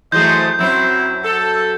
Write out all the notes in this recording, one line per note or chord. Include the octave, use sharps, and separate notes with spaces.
E3 F#3 A3 G#4 C5 D#5 G6
F#2 F#3 C4 E4 C5
A4